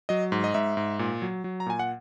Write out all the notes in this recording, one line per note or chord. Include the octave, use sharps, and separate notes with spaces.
F#3 D#5
G#2
D#5
G#2 E5
G#2
A#2
F#3
F#3
A#5
A#2 G#5
F#5